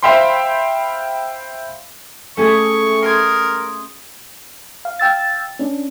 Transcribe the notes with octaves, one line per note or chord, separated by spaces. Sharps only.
C5 E5 F5 G5 B5 C6
A3 C#4 G#4 C#6
A#4 C6 D#6 G#6
F5
F5 G5 E6 A6
C#4 D4